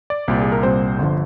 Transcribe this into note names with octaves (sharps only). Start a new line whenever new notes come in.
D5
C2 A#2 G3 C4 G4
G#4
A#4
C2 A#2 G3 C4 C5
G1 D3 F3